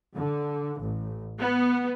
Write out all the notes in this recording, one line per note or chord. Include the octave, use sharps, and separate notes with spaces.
D3
A1
B3